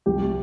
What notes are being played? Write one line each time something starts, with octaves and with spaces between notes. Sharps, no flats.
C2 G4